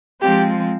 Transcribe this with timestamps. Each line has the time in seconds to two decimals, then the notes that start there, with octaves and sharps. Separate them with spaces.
0.22 F3 G#3 C4 F4 G4